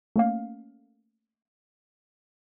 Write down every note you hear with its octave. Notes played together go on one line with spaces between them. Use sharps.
A3 A#3 C#4 F5